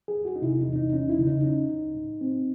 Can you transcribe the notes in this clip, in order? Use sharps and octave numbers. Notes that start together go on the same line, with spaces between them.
G#4
E2
F#4
D#4
C3 E4
D#4
E2
D#4
C#4 D#4
E4
C#3
D#4
C#4 D#4
C#2
A2
C4